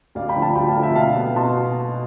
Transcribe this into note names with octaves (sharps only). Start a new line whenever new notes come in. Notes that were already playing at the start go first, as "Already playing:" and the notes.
D2 D5 F5
G5 B5
D3 F3
F5 A5
D2 G5 B5
F5 A5
D3 F3
E5 G5
B2 F5 A5
B3
B2 A5 C6